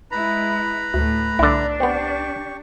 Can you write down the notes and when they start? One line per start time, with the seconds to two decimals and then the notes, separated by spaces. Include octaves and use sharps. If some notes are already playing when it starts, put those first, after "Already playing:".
0.11 G#3 E4 B4 A#5 B5
0.94 D2 A2
1.39 C2 D3 D4 E4
1.80 B3 C4 G4 C#6